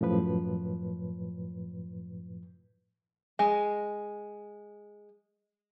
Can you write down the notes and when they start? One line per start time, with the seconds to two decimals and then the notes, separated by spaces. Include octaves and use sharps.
0.01 F#2 A2 F3 B4
3.39 G#3 D#5 G#5